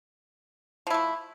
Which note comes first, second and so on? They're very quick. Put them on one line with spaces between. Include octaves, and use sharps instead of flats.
F3 E4 A3